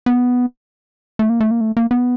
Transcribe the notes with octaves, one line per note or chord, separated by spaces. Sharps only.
B3
A3
A#3
A3
A#3
A3
A#3
B3